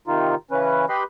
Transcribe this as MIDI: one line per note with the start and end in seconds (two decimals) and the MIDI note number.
0.07 0.35 48
0.07 0.35 51
0.07 0.35 63
0.07 0.35 65
0.51 0.85 49
0.51 0.85 52
0.51 0.85 61
0.51 0.85 71
0.89 1.03 67
0.89 1.03 71
0.89 1.03 75
0.89 1.03 83
0.89 1.03 84